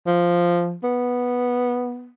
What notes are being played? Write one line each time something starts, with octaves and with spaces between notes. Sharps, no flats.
F3
B3